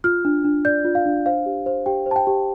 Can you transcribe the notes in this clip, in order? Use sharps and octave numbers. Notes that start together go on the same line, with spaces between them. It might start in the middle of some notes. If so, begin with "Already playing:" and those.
F4 F6
D4
D4
D5 G6
F4
F5
D4
C5 F5
G4
C5
G4 G5
C5 A5
G5
G4